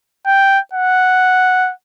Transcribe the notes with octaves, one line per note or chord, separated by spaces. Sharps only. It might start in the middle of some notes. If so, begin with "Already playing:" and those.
G5
F#5